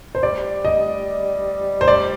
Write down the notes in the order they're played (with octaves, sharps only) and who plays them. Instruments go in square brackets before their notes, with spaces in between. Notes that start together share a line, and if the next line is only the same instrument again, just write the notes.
[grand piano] C5
[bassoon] G3 [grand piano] D5
[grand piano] D#5
C5
[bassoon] G3 [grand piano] D5